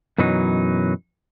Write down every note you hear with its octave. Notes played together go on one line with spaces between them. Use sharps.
F#2 B2 E3 F#3 D#4